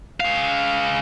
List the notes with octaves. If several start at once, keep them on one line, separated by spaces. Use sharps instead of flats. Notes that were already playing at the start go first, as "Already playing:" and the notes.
G#3 F5